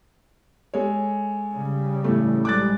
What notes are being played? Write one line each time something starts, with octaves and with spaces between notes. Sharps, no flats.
G#3 A4 C#5
C#3 G3
A2 E3 A3
A#1 G3 G#3 D6 F#6 A6